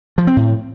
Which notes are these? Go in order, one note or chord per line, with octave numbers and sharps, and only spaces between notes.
F3
C4
A2